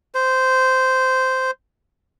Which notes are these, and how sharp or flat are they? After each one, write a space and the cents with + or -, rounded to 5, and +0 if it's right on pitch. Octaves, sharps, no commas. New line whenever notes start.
C5 -15